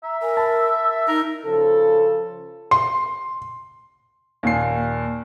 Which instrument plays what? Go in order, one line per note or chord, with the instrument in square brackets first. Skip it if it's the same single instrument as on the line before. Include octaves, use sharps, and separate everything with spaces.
[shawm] E5 [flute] A#5
[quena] A#4 [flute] G#5
[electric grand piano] A5 [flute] B5
[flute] E6
[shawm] E5
[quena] D#4 [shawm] A#4
[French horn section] C#3 F3 A4
[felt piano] C6
[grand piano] D#2 A#2 C7